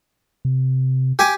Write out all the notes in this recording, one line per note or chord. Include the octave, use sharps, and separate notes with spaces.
C3
G4 G#5 D6